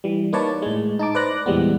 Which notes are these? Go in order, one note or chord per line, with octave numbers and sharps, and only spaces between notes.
E3 G3
A#3 D#4 B4 C#5 D5 A5
A2 G#3
D#4 A5 D6
B4 C5 D5 D6 F#6 A#6
E2 A#2 E3 G3 G#3 B3